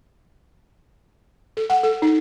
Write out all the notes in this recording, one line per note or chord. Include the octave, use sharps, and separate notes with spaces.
A4
F#5
A4
D#4